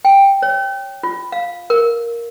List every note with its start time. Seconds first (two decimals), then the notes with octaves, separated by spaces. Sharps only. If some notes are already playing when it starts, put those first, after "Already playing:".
0.05 G5
0.42 C#5
1.03 F4
1.32 F5
1.70 A#4